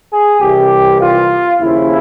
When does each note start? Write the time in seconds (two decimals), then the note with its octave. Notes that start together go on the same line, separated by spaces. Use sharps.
0.12 G#4
0.41 C2 C3 E3 G4
1.01 F4
1.60 D#2 C#3 F3 E4